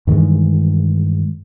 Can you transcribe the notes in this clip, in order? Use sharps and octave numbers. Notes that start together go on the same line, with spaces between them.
G2 D#3 E3 G#3